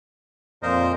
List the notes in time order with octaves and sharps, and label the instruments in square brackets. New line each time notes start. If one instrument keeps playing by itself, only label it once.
[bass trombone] F2 [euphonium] A#2 [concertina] A#4 C5 D#5